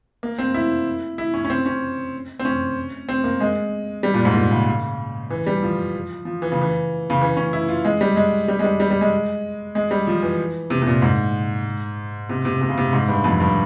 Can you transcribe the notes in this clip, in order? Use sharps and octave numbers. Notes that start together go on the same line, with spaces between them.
A#3
C4
E4
E4
C#4
C#4
C4
C#4
C4
C#4
C4
A#3
G#3
G3
A#2
G#2
A#2
C#3
E3
G3
F3
F3
E3
C#3
E3
C#3
E3
C#4
E4
F4
G#3
G3
G#3
G3
G#3
G3
G3
G3
G#3
G#3
G3
F3
E3
C3
C3
A#2
G#2
C3
C3
C3
C#3
C3
G#2
G2
F2
G2